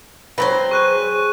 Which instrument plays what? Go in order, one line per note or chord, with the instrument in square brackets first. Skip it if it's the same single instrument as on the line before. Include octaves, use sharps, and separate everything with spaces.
[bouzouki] F#3 C4 C5 [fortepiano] B4 B5
[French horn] G#4 [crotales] C#6 F#6 D#7